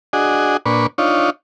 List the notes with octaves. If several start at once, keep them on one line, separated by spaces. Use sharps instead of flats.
D4 F#4 G#4 D#5
A#2 D4 B4 C#6
D4 D#4 F4 C#5